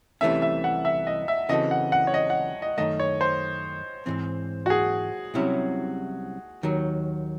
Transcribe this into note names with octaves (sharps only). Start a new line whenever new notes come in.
C2 C3 E3 A3 C#4 E5
E5
F#5
E5
D#5
E5
C#3 E3 C4 F#4 A4 D#5
F#5
F#5
C#5
D#5
F#5
D#5
F#2 D#3 A3 D#5
C#5
C5
G#2 E3 C4
F#4
G#4
C2 C3 F#3 C#4 E4
D#2 D#3 F#3